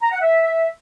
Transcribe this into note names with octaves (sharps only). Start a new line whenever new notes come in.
A#5
F#5
E5